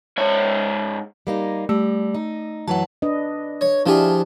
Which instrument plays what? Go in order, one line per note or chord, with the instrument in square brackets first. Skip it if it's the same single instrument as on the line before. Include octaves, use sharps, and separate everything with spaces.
[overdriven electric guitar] G#2 C#5
[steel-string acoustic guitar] G3 A#3 D#4
[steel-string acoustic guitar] G3 [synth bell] A3
[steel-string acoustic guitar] D#4
[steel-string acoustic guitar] F#2 E3 F#3 [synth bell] F#5 A5
[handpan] D4 B4 D#5
[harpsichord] C#5
[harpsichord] F3 G4 G#4 [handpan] D4 E4